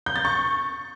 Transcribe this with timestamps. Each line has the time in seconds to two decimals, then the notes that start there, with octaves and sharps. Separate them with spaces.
0.06 G6
0.16 A6
0.25 C#6